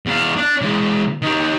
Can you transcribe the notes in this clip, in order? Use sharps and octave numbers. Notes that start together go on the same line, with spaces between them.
E2 F5
D4
E3 G#3
D#3 G4